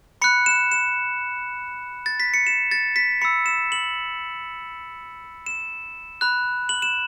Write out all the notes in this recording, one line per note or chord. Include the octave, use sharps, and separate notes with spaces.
B5 F#6 C#7
E7
E7
A6
B6
C#7
E7
A6
B6
B5 E6 C#7
E7
F#7
E7
B5 F#6
F#7
E7